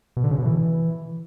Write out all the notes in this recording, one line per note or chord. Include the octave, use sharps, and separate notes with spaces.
B2
D3
C#3
B2
E3